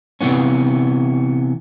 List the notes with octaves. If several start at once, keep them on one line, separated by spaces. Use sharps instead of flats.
C3 E3 B3 C#4